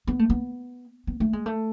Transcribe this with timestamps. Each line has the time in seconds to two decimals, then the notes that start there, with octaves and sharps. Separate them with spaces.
0.07 B3
0.19 A3
0.30 B3
1.07 B3
1.20 A3
1.33 G#3
1.46 A3